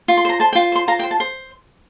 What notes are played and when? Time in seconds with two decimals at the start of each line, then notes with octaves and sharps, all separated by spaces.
0.08 F4
0.17 C6
0.25 C5 A#5
0.40 C5 A5
0.53 G5
0.55 F4
0.72 C5 C6
0.88 F4 A#5
0.99 G5
1.03 C5
1.11 A5
1.20 C5